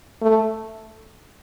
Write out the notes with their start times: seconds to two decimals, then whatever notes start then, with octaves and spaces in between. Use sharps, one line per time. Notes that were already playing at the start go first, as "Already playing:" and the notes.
0.22 A3